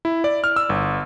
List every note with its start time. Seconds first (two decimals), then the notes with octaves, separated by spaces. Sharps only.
0.05 E4
0.24 D5
0.44 F6
0.56 E6
0.69 G1